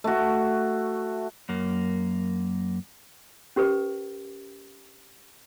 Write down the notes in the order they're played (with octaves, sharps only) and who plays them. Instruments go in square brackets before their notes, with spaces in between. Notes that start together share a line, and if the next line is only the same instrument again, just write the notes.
[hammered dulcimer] A3 F#4
[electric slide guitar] F#2 A#3
[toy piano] C#4 G4 A#4 B4